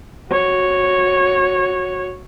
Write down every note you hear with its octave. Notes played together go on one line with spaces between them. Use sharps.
F#4 C#5